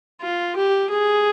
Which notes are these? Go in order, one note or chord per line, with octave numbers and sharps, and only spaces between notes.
F4
G4
G#4